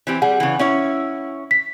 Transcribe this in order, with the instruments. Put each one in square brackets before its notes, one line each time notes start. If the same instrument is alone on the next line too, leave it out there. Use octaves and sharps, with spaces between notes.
[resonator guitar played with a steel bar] E3 C4 G4
[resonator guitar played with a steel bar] G3 G#4 [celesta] F#5
[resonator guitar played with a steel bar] C#3 E3
C#4 E4 C#5
[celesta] B6